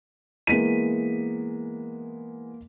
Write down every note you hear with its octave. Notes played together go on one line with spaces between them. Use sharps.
E3 G#3 A#3 B3 B6 D#7